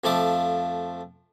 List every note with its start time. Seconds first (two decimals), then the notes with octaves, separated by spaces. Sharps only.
0.04 F2 F3 A3 D6